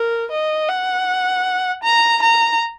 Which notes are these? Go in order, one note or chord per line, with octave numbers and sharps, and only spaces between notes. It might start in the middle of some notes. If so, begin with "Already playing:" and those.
Already playing: A#4
D#5
F#5
A#5
A#5